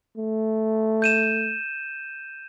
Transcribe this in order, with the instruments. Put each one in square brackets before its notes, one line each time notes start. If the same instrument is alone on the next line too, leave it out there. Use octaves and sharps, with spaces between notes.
[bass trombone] A3
[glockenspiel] G6 D#7 E7